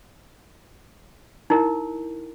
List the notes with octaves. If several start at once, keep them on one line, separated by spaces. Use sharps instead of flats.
D#4 E4 A#4